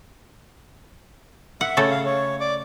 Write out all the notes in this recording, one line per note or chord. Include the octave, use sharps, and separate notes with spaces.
E5 F#5
C#3 A3 A4
F5
C#5
D5 D6